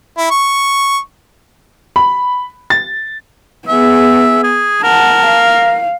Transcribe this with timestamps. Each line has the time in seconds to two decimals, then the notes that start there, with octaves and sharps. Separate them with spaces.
0.18 E4
0.31 C#6
1.96 B5
2.70 A6
3.68 B3 G#4 E5
4.44 G#4
4.83 A#4 F#5 A5
5.27 F5